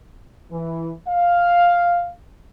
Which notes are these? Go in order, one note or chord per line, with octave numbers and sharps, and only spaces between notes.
E3
F5